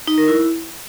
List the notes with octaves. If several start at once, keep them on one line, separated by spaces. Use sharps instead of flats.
D#4
A#4
E4